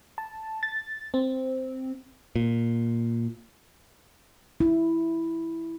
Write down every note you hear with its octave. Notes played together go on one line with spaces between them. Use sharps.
A5
A6
C4
A#2
E4